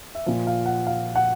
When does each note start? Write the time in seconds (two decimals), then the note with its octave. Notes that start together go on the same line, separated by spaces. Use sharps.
0.15 E5
0.26 A#2 F3 F5
0.47 F5
0.66 F#5
0.87 F5
1.16 F#5